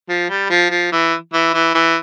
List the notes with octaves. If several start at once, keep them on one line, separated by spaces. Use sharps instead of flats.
F3
G3
F3
F3
E3
E3
E3
E3